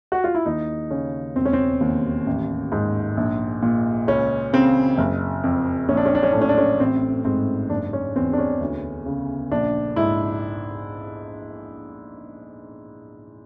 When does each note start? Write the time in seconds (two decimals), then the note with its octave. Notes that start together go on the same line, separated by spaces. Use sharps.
0.12 F#4
0.24 F4
0.35 E4
0.46 D#2 D#4
0.91 C#3 C#4
1.36 E1 C4
1.45 C#4
1.53 C4
1.81 D#2
2.26 A1
2.72 G#2
3.17 A#1
3.62 A#2
4.07 C#2 C#4
4.53 C#3 C4
4.98 F#1
5.43 F2
5.88 A#1 C#4
5.97 D4
6.06 C#4
6.15 D4
6.23 C#4
6.32 A2 D4
6.41 C#4
6.49 D4
6.58 C#4
6.80 A1 C4
7.25 G#2 C4
7.70 F#1 D4
7.93 C#4
8.15 E2 C4
8.33 D4
8.38 C#4
8.60 D2
9.06 C#3
9.51 A#1 D4
9.96 G#2 E4